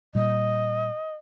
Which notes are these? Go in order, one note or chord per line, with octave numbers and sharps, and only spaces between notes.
A#2 G3 D#5